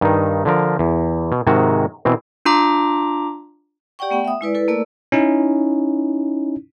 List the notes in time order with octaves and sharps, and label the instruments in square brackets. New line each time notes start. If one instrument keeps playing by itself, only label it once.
[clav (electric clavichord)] G2 D#3 D#4
D3 F3 A#4
E2
B2
G#2 C3 D#3 G#3 F#4
B2 E3 C4
[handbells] D4 F4 A#5 D6
[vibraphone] G4 D5 F#5 G5 C#6
A3 B3 F#5 G5 B5
E5 D#6
G#3 E4 B4 D5
E4 A4 B4
A3 A#3 A4 A#4 D5 E6
[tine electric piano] C#4 D#4 E4